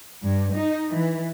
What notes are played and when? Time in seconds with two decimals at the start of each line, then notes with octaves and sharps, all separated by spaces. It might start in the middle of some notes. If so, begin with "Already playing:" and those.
0.23 G2
0.54 D#4
0.90 E3